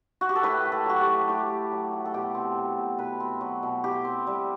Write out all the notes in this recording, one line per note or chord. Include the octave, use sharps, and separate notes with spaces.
F#4
G4
A4
A2 B4
A3
A4
F#3 F#4
G4
A2
A2 G4
A3
F#3
A2
A4
B2 G4
C4
F#3
B2
B2 B4
C4
F#3
B2
E4 G4
C4
G3